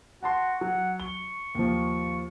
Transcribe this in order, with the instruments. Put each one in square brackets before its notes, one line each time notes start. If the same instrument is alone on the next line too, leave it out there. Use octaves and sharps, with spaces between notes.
[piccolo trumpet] F#4 [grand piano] F#5 A5 C6
[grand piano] F#3 [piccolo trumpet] F#5
[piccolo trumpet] C#6 [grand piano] G7
[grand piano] D#2 F3